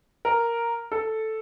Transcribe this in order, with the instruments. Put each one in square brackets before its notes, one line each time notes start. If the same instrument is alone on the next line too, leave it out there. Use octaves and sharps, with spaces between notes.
[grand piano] A#4
A4